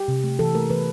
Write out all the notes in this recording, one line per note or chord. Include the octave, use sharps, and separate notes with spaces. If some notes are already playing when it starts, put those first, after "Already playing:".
Already playing: G4
C3
A3
E3 A4
A3 A#4
E3 B4